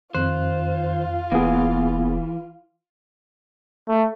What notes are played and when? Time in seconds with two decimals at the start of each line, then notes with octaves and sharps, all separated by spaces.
0.15 F2 D#3 F4 C5 F#6
1.32 E1 E3 A#3 B3 G#4
3.88 A3